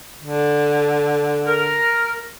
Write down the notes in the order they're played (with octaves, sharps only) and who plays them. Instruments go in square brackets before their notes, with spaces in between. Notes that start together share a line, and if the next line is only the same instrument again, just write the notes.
[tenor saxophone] D3
[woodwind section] A#4